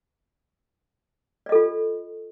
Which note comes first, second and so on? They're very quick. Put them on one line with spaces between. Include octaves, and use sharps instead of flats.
D5 D#5 A4 F4